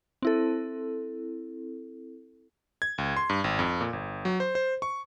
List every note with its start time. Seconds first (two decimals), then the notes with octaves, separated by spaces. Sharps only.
0.22 C4 E4 A4
2.82 G#6
2.98 C#2
3.17 C6
3.30 G2
3.44 G#1
3.59 F2
3.81 A#2
3.93 G1
4.25 F#3
4.40 C5
4.55 C5
4.82 C#6